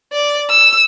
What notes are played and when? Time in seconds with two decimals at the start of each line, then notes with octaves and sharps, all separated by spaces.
0.13 D5
0.50 E6